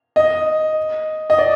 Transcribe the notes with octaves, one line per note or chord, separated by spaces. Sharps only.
D#5
D#5
D5